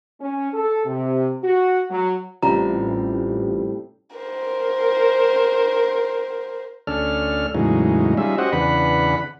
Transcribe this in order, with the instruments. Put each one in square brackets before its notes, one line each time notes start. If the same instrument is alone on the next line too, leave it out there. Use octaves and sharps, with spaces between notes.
[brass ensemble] C#4
A4
C3
F#4
F#3
[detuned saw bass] A1 [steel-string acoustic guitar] A2 G3 C4 [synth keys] C#4 F4 G4 [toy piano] A#5
[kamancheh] A#4 C5
[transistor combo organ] D2 C#4 D4 A4 F6
E2 A2 C#3 F#3 G#3 D#4
G3 C#4 D#4 F4 G#4 E5
C#4 F#4 G4 C5 D#5 F#5
E2 C#3 D4 B4 F#5 B5